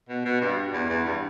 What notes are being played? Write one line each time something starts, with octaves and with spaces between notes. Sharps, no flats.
B2
B2
G2
E2
E2
G2